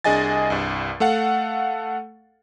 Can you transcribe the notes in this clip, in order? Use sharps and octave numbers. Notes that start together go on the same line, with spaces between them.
C2 D4 G#4 D#5 G#5 A6
C2 G2
A3 A4 F5 F#5